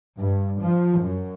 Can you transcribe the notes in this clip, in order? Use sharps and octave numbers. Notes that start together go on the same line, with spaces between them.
G2
F3
F#2